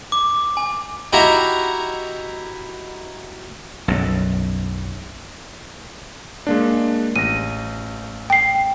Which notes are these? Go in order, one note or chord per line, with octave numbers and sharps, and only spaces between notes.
D6
G#5
D#4 E4 F#4 G4 E5 A#5
B1 F#2
G#3 A#3 D4
A1 A#6 D#7
G5 C7